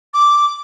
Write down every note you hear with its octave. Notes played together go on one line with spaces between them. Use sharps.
D6